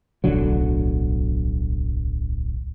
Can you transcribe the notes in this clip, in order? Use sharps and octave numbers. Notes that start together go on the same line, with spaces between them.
D1 B1 D3 F#3